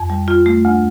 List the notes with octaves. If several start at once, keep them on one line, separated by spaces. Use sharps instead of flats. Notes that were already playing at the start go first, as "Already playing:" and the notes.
Already playing: F2
G3
F4
A3
D2